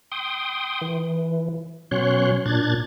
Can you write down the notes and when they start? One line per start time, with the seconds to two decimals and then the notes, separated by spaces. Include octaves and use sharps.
0.12 G5 C6 D#6
0.81 E3
1.91 B2 F#3 C#4 C#5 C6 F#6
2.46 A#2 D4 F#6 G#6 A6